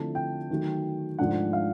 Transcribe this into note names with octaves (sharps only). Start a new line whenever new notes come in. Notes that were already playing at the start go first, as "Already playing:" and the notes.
Already playing: D3 F3 A3 C4 E4 A5
G5
D#3 F#3 A3
G#2 F3 A3 D4 F#5
F5